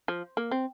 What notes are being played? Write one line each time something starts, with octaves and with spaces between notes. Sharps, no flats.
F3
A#3
C4